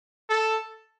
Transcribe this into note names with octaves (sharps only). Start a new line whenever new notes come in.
A4